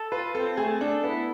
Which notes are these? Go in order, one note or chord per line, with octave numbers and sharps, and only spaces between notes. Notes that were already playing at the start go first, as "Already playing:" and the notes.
Already playing: A4
F4 B4
C4 A4
A3 G#4
D4 A4
B3 E4